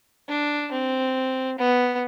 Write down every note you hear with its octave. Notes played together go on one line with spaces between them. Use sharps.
D4
C4
B3